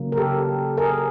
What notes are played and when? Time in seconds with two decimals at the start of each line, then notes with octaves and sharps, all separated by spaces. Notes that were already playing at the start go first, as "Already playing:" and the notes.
Already playing: C#3 F#3 A#3
0.12 A#4
0.17 G4 A4
0.77 G#4 A#4